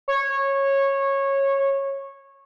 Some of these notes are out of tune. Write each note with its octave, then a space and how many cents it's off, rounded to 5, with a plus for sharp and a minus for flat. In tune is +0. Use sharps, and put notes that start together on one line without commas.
C#5 -15